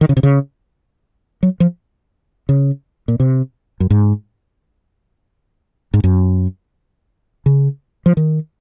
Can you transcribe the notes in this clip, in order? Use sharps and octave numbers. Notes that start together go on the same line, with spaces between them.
D#3
C#3
C3
C#3
F#3
F3
C#3
A#2
C3
F#2
G#2
G#2
F#2
C#3
F3
D#3